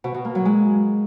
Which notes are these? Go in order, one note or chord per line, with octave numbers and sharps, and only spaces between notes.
B2
B2
A#3
F#3
G#3